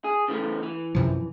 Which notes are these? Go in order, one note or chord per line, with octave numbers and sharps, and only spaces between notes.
G#4
C#3 E3 A3
E3
F#2 C3 F3